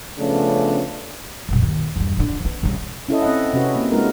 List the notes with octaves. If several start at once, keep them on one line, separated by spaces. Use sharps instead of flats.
C#3 F3 A3 B3 C#4 D4
F#1 B1
D#2
E2 G2
F2 D3
B3
C2 C#3
C#4 E4 A4 D#5
C4 D#5 F#5
C3 C#4 F#4 B4
A#3
G#3 A3 B3 D#4 F4 A#4